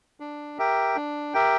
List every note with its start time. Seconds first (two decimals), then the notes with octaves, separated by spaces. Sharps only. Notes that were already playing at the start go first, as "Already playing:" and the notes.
0.20 D4
0.58 G4 A#4 E5 G5
0.96 D4
1.34 G4 A#4 E5 G5